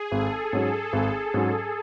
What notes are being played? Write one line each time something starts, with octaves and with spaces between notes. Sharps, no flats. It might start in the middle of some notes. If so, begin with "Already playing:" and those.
Already playing: G#4
G#1 A4
G#2 F#3 C#4
G#1
G#2 F#3 C#4